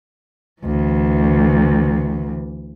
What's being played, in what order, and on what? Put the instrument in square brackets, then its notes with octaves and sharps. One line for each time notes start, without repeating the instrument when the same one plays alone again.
[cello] D2 E3